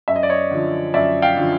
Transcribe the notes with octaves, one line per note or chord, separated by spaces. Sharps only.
F#2 E5
D#5
D5
C#5 D#5
D3 F3
F#2 D5 E5
F5 G5
D3 F3